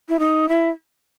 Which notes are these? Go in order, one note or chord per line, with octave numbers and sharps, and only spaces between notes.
E4
D#4
E4